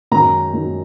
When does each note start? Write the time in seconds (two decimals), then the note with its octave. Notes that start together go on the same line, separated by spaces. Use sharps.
0.11 F#2 D#3 G#3 A#5
0.53 F#2 D#3 G#3